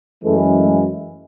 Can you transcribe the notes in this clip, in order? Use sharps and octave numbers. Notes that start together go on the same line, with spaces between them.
F#2 E3 G#3 A3
A3